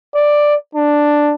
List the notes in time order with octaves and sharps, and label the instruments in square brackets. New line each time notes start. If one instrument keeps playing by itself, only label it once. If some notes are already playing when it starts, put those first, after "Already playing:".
[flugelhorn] D5
D4